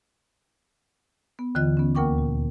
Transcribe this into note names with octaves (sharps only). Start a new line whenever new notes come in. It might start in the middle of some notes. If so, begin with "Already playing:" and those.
B3
D#2 D3 E3 F4 D#5 F#6
B3 C#4
D2 A#3 A#4 G5 C#6 D6
A#2